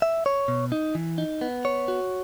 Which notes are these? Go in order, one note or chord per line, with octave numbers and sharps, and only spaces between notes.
E5
C#5
B2
D#4
E3
D#4
B3
C#5
F#4